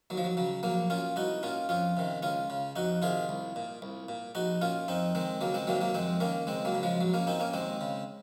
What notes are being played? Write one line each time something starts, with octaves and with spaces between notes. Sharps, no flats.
D#2 F#3
F3
F#3
C#3 F#3
A#1 F#3 A#3
A#2 C#4 F4
C2 D#4 F#4
A#2 C#4 F4
F2 C#4 F4
C3 D#3
C#2 C#4 F4
C#3
F2 D#4 F#4
C3 D#3 F4 G#4
C2
A#2
C2
A#2
A#1 D#4 F#4
A#2 C#4 F4
F2 C4 D#4
D#3 G#3 C4
C#2 F#3 A#3
G#3 C4
C3 D#3 F#3 A#3
F#3 A#3
F2 G#3 C4
D#3 A#3 C#4
C#2 G#3 C4
F#3 A#3
C#3
F3 G#3
A#1 F#3
A#3 C#4
A#2 C4 D#4
A#3 C#4
D#2 G#3 C4
C#3